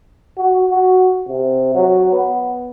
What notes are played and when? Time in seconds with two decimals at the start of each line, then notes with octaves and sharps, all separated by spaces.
0.37 F#4
0.70 F#4
1.28 C3
1.75 F#3
2.12 B3